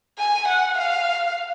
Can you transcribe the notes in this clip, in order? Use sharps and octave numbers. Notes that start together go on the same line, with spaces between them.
G#5
F#5
F5